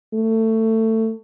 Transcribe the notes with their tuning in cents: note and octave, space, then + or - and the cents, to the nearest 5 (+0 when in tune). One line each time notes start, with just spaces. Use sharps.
A3 +20